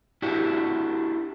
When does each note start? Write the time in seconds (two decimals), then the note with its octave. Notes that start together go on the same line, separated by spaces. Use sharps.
0.22 D4 E4 F#4 G4